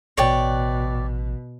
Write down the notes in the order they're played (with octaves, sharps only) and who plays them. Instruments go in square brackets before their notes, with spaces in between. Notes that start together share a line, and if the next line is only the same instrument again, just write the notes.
[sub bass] A1 [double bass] B2 [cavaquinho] C#5 D5 G5